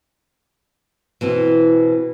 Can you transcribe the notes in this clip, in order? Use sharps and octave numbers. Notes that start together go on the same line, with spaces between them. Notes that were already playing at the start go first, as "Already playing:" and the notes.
B2 E3 C4